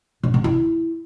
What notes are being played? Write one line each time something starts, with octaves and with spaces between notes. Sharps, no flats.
C3
C3
E4